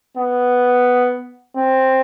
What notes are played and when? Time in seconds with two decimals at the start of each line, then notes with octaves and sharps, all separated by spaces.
0.17 B3
1.57 C4